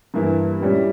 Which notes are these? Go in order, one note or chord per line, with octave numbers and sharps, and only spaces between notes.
G2 E3 A#3 E4
A#2 G3 C#4 E4